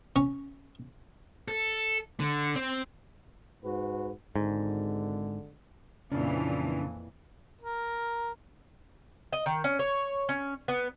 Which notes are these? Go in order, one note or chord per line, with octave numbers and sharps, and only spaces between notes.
C#4
A4
D3
C4
G#2 F#4 B4
G#1 G#2 D3 G#3
F2 A#2 C#3 E3 C#4 D4
A#4
D#5
D#3
C#4
C#5
C#4
B3